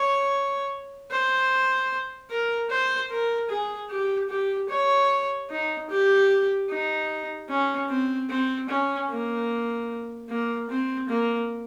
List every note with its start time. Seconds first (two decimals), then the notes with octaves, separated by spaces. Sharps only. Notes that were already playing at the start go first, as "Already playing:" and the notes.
Already playing: C#5
1.11 C5
2.30 A#4
2.70 C5
3.10 A#4
3.49 G#4
3.90 G4
4.29 G4
4.69 C#5
5.50 D#4
5.90 G4
6.70 D#4
7.49 C#4
7.89 C4
8.30 C4
8.69 C#4
9.10 A#3
10.29 A#3
10.69 C4
11.09 A#3